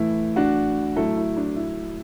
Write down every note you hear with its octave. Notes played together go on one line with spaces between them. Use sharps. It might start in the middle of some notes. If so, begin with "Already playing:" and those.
Already playing: A2 E3 A3 E4
D4 F#4
A2 F#3 A3 E4 A4
E4
D4
E4